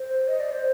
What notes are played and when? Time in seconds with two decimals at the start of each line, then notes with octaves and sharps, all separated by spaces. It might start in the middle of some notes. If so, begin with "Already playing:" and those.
Already playing: C5
0.28 D#5
0.40 D5
0.52 C5